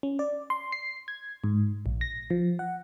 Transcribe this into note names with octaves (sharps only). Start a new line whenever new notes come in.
C#4
D5
C6
C7
G#6
G#2
A#1
A#6
F3
F#5